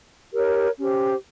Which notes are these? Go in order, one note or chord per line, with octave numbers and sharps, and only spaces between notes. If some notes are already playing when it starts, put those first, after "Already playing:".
G4 A#4 C#5
C#4 G4 C5